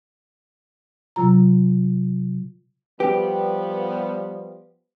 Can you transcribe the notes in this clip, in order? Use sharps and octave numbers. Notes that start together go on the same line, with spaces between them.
C3 F#3 F4 A#5
F3 G3 B3 G4 B4